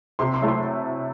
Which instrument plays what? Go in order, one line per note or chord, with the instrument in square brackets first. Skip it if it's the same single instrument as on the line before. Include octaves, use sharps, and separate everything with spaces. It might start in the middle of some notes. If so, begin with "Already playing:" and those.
[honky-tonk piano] C3 [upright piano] C6
[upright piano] C6
[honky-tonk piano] F#3 A3 E4
[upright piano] C6